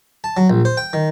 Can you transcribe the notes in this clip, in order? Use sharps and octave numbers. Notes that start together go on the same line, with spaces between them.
A5
F#3
A#1
C5
G5
D#3